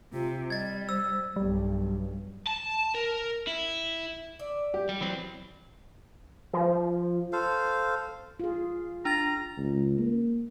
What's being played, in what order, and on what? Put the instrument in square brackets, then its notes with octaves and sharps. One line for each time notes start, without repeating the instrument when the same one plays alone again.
[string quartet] C3 [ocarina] F4
[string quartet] G3 [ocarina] D#5 [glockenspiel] G#6 A6
[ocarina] C5 [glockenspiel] E6
[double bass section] B1 G2 [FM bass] G3
[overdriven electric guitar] A5
A#4
E4
[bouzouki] D5 E5
[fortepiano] G4
[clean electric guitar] G3
E3 F#3 C4
[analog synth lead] F3
[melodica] A4 C5 F5
[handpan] F4 G#4
[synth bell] D4 A6 [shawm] A#5
[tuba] C#2
A#3